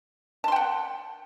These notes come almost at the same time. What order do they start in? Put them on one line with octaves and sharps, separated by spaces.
A5 C6 G5 F#5